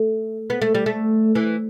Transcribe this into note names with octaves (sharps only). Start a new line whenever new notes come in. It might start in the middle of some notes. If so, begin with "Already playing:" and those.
Already playing: A3
B3
A3
G3
A3
E3